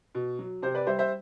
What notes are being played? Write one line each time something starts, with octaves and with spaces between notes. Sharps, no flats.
B2
F#3
C3 C5
B4 D5
G3 C5 E5
C5 E5